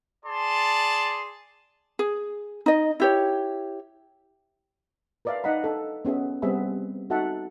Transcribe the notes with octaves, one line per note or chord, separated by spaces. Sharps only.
G#4 D5 A5 C6
G#4
D#4 D#5
E4 G4 C#5
A#4 B4 D5 E5 F5
D#4 D#5 F#5 A#5 B5
D4 A4
B3 C#4 G#4 E5
G3 B3 C4 G#4 E5 B5
D#4 F#4 A4 E5 F#5 A5